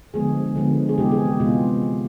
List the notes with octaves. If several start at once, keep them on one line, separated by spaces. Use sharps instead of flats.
D3 F3 G#3 B3 G#4
D3 F3 G#3 B3
G#4
C3 E3 G#3 B3 G4
G#4
G4
C3 E3 G#3 B3 F4